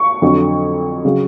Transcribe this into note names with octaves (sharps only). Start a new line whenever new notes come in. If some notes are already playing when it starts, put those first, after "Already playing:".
Already playing: C#6
F2 D3 F#3
C#3 F#3